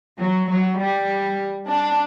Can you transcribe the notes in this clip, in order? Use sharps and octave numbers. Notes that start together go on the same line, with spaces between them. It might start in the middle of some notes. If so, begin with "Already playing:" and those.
F#3
F#3
G3
D4